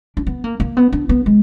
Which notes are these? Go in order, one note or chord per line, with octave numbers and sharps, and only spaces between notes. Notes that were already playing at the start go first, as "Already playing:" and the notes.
D4
B3
A#3
A#3
B3
D4
B3
G#3